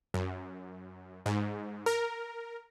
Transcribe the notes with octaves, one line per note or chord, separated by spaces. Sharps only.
F#2
G#2
A#4